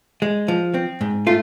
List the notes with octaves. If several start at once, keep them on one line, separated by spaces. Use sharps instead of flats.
G#3
F3
C4
G#2
A3 F4